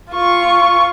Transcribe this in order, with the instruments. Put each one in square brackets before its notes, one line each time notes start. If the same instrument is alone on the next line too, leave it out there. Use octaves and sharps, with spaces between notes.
[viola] F4 C#6